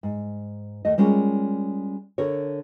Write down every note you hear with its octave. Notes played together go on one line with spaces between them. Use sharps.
G#2
D#2 A3 D#5
G3 G#3 C#4 F4 A#4
D3 A4 A#4 C#5